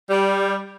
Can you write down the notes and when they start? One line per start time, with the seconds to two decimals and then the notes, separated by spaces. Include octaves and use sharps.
0.10 G3